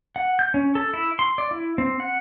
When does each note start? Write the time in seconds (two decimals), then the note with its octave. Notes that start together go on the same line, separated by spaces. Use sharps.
0.16 F#5
0.39 G6
0.54 C#4
0.75 A4
0.94 E4
1.19 C6
1.38 D5
1.51 E4
1.78 C4
2.00 F#5